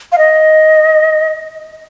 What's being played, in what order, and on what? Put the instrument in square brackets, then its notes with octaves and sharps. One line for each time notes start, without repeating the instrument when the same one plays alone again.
[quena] F5
D#5